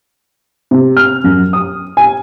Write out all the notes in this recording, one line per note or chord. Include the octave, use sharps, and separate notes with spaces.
C3
F6
F#2
D#6
G#5